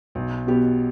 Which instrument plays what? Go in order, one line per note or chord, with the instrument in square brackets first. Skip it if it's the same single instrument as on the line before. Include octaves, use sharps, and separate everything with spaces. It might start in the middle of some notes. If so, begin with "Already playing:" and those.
[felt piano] B1
B2 B3 G4